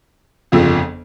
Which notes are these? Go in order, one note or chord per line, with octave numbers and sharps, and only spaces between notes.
G1 F2 C#3 F3